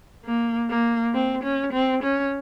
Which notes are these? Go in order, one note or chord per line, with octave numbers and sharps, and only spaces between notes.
A#3
A#3
C4
C#4
C4
C#4